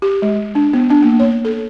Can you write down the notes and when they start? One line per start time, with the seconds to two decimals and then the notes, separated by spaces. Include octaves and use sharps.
0.02 G4
0.22 G#3
0.55 D4
0.73 B3
0.90 D4
1.02 A#3
1.19 C#5
1.45 A4